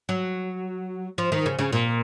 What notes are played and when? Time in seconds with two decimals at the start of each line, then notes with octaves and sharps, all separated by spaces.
0.09 F#3
1.18 F3
1.32 D#3
1.46 C#3
1.59 C#3
1.73 A#2